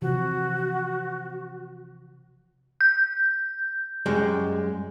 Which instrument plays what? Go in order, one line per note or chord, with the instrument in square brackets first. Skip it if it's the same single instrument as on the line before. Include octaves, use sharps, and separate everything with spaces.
[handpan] C3 E3 F3 [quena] F#4
[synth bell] G6
[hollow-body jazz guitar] F#2 G3 G#3